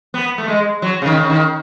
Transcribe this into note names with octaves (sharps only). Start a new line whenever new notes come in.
B3
A3
G#3
F#3
C#3
D#3
C#3
D#3